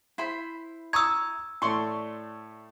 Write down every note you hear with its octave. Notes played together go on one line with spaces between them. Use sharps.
E4 C5 B5
A#5 C#6 D#6 E6 G#6
A2 A3 D5 C6 C#6